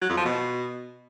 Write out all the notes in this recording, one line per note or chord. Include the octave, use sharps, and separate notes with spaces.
F#3
F2
F3
B2